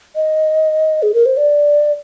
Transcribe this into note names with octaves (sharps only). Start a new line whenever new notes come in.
D#5
G#4
A#4
C5
D5